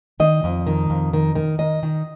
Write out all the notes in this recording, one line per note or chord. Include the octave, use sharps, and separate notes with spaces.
D#3 D#5
F2
D#3
F2
D#3
D#3
D#3 D#5
D#3